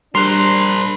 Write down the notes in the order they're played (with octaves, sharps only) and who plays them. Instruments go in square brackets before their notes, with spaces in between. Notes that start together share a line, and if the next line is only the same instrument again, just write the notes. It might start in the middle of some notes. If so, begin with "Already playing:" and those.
[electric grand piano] G3 F#6 [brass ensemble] D4 [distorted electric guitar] A#4 C5 [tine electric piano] C6